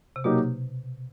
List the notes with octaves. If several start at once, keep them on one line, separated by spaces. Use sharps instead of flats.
C3
B2 F#3 A#3 D#4 G4